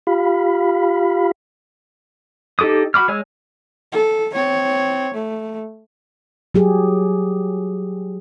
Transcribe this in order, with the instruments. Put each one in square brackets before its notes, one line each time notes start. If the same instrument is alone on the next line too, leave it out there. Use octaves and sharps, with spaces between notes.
[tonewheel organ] F4 G4 F5 B5
[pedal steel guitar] D#4 G4 A4 D6 D#6
F#4 B5 D6 F6
G#3 C#5 G#5 E6
[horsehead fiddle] A4
C4 C#5
A3
[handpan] F#3 G4 G#4